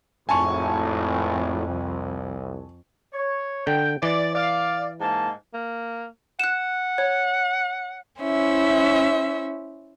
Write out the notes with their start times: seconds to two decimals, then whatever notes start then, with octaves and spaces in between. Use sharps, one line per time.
0.29 G#1 F2 A2 G#5 A5 C#6
1.67 C2
3.14 C#5
3.67 D3 G5
4.03 E3 D5
4.35 D5 F5
5.01 G#2 A#3 A5
5.54 A#3
6.40 F#5 F#6 E7
6.98 C#5
8.21 C#4 E4 C5 E5